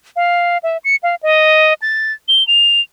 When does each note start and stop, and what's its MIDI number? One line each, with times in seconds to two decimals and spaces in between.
0.16 0.58 77
0.63 0.77 76
0.84 0.96 97
1.03 1.15 77
1.23 1.74 75
1.82 2.12 93
2.28 2.46 103
2.47 2.81 101